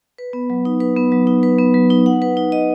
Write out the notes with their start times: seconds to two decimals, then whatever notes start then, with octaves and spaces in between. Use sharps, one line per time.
0.18 B4
0.33 B3
0.50 F#3
0.65 D#4
0.80 B4
0.97 B3
1.12 F#3
1.27 D#4
1.43 B4
1.58 B3
1.74 F#3
1.90 D#4
2.06 F#5
2.22 B4
2.37 D#4
2.52 D#5